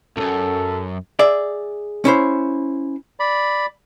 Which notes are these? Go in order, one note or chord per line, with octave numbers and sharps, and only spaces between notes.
C#2 F#2 A4
G#4 D5 E5
C#4 E4 C5
D5 B5